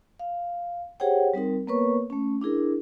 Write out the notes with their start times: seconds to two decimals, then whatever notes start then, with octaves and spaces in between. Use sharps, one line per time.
0.19 F5
1.00 G4 G#4 C5 C#5 F#5 G5
1.34 G3 C4 D#4 A#4
1.67 A#3 B3 A#4 B4 C#5 C#6
2.10 A3 C#4
2.41 D4 E4 G#4 A#4